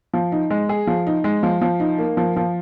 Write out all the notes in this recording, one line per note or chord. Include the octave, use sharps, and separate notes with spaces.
F3
D#4
G#3
G#4
F3
D#4
G#3
F3
F3
D#4
A#3
F3
F3